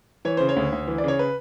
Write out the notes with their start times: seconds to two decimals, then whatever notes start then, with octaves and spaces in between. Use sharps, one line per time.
0.25 E3 C#5
0.37 C#3 C5
0.49 C#5
0.56 D2
0.72 D2
0.88 E3
0.98 D5
1.04 C#3 C#5
1.19 B4